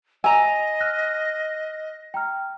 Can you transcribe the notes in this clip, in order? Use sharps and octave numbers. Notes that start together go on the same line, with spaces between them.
D#5 G#5 A#5 E6 D#7 F7
F6 F#6 A#6
G5 A#5 F6